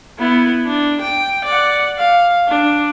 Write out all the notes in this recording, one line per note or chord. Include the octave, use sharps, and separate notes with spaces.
B3 E4
D4
G5
D5 F#5
F5
D4